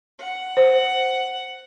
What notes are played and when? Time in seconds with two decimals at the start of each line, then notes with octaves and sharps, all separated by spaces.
0.19 F#5
0.57 C5